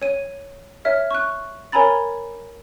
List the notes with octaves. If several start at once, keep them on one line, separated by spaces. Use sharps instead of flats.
C#5 D#7
C#5 E5 F6
C#6 F#6
A#4 C#5 G#5 A#5 B5 A6